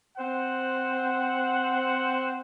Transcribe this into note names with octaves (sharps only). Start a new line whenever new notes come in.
C4 C5 F#5